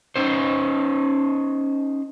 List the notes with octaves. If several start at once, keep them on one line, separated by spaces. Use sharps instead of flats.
C#4 D#4 C5